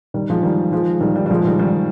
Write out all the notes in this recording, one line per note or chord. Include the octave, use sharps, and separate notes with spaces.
D#3 G3
F3 G#3
D#3 G3
F3 G#3
D#3 G3
D#3 G3
G3
F3 G#3
D#3 G3
D#3 G3